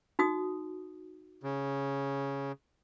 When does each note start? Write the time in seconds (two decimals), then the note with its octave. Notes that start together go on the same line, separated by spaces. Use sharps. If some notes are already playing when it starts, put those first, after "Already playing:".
0.19 D#4 F#4 D#6
1.43 C#3